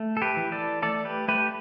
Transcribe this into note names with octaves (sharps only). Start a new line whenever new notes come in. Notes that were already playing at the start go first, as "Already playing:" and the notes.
Already playing: A3
A4
G4 B4
E3
A4 D5
A3 A4 D5
G4 B4
A3 G4 B4